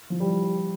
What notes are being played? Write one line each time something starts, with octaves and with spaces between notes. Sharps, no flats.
F3
G3